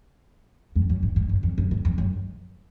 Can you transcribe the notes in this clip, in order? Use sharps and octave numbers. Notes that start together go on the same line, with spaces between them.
F2
F#2
G#2
G#2
F#2
F2
F#2
G#2
F2
F#2